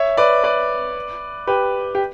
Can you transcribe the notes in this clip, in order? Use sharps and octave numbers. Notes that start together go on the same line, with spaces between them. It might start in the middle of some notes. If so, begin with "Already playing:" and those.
Already playing: C#5 E5
B4 D5
B4 D5
G4 B4
G4